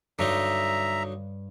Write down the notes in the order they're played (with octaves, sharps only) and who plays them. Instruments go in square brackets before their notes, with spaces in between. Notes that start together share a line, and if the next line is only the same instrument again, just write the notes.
[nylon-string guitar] G2 [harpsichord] D3 F#3 D#4 [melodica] E5 A#5